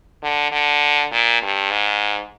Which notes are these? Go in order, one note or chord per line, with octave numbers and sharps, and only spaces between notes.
D3
D3
A#2
G2
G#2